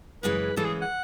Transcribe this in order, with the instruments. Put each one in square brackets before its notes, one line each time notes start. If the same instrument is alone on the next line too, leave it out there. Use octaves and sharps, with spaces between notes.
[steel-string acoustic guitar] F#2 C#3 E3 G#3 C#4 [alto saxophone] B4
[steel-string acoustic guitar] F#2 C#3 E3 G#3 C#4 [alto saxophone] A4
[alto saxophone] G#4
F#5